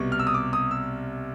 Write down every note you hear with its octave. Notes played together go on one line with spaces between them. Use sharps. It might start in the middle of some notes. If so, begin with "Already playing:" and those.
Already playing: C2 B2 G3 C#6
F6
E6
D#6
D6
D#6
E6